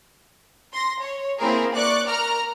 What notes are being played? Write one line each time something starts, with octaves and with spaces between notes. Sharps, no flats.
C6 A#6
C#5
A#3 C4 E4 G#4 A#4
D5 C#6 D6 F#6
A#4 A#5 F6